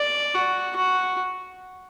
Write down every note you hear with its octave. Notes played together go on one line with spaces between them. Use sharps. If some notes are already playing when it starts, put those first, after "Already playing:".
Already playing: D5
F#4
F#4